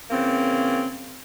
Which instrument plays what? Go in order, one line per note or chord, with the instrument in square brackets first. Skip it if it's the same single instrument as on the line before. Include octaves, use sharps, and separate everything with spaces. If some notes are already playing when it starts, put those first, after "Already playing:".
[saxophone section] C#3 E3 A#3 C4